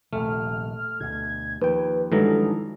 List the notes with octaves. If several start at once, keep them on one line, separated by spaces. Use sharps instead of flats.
D#1 A#1 C3 A3 F6
D2 B2 G#6
D#2 F3 B4 G5
G2 D#3 E3 F#3 G#3 D#4 A4